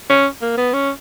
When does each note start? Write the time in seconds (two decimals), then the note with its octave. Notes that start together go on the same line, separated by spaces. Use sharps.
0.10 C#4
0.42 A#3
0.57 B3
0.73 C#4